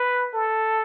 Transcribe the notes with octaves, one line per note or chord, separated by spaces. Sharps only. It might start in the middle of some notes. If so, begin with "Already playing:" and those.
Already playing: B4
A4